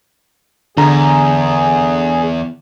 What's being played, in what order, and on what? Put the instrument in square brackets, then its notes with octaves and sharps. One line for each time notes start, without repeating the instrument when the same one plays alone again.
[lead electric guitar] E2 [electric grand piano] D3 A#5 [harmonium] G#4